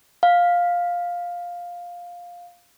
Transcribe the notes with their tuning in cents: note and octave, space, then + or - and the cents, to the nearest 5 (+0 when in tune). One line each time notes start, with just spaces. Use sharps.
F5 +10